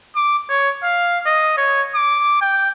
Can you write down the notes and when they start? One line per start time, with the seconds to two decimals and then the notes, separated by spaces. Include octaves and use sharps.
0.15 D6
0.50 C#5
0.83 F5
1.26 D#5
1.57 C#5
1.95 D6
2.41 G5